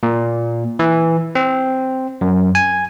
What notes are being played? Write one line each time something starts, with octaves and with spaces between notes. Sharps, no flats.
A#2
E3
C4
F#2
G#5